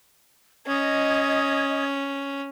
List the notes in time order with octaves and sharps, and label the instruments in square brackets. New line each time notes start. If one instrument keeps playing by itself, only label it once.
[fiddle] C#4 [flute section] D#5 D#6 G#6